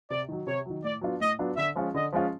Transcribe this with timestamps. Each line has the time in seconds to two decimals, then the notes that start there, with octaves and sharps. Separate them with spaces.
0.10 C3 D5
0.29 D#3 F#3
0.47 C3 C#5
0.66 D#3 F#3
0.84 A2 D5
1.01 F#3 B3 D4 F4
1.20 A2 D#5
1.39 F#3 B3 D4 F4
1.57 D3 E5
1.75 F3 G#3 C#4 F4
1.94 D3 D#5
2.12 F3 G#3 C#4 F4